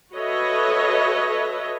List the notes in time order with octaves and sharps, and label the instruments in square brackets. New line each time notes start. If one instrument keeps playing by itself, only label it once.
[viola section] F#4 A4 B4 C#5 D#5 E5